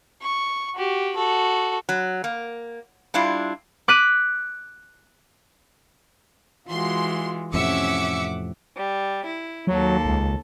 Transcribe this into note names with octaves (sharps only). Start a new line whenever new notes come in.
C#6
F#4 G4
F#4 A4
F#3
A#3
G3 D4 E4 F4
D6 F#6 B6 D#7
E3 G#3 F4 F#4 C6
F2 A2 C3 C#4 E5 F#5 D6 C#7
G3
E4
D#2 F#3 A4
C#2